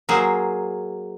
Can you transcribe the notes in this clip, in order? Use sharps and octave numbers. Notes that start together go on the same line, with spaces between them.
F#3 A#3 G#4 C5